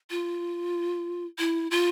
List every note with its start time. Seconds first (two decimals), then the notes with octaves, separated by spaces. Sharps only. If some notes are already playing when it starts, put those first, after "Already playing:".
0.10 F4
1.39 E4
1.71 F4